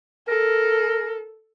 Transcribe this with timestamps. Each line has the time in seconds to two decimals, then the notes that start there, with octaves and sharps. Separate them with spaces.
0.28 A4 A#4